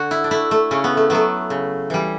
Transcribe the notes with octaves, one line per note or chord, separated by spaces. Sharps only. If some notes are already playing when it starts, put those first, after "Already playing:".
Already playing: D3 F#4
E4
D4
A3 E4
A3
C#3 C#4
B3
A3
F#3 A3 B3
C#3
E3 G3